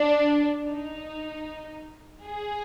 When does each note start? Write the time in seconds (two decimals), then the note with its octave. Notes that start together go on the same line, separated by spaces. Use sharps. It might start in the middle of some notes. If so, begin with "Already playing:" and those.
Already playing: D4
0.68 D#4
2.26 G#4